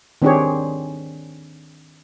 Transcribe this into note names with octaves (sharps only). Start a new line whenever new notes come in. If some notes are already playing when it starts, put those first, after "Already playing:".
D#3 C4 D4 G4 G#4 C#5